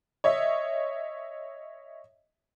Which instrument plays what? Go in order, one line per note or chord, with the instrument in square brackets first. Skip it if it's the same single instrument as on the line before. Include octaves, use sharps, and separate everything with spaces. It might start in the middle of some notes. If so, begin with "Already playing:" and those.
[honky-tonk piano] C#5 D#5 E5